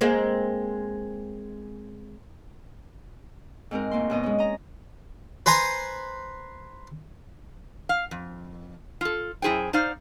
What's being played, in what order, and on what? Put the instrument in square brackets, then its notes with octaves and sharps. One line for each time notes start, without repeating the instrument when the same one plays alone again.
[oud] G#3 A#3 C4
[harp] G#2 G#3 C4 A#4
D2 A#3 C6
F#2 B2 D#5
G#3 C#4
D#5 A#5
[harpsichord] B4 C5 G#5 A#5 C6
[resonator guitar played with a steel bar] F5
F2
F4 A4
F#2 E4 G#4 C5 G5
D#4 C5 D5 F5